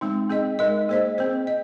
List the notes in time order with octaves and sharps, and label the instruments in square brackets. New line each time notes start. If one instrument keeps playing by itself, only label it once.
[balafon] G#3 C4 D#4
C4 G#4 D#5
G#3 D#4 A#4 D#5
A#3 G#4 C5 D#5
C4 G#4 C5
D#5